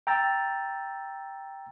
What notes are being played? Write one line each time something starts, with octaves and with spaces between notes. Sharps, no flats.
G5 A#5 E6 A6